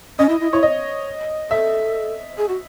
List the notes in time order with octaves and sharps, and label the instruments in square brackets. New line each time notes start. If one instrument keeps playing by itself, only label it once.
[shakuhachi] C#4 [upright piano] D#5
[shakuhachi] E4
E4
[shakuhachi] E4 [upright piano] C#5
[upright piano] D#5
[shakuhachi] A4 [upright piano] E5
[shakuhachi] G#4
F#4